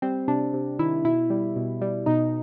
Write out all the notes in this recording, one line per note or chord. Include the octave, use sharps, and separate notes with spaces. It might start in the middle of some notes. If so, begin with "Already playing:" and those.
G3 C4
C3 D4
C3
D#3 E4
B2 E4
G3
B2
G3
B2 D#4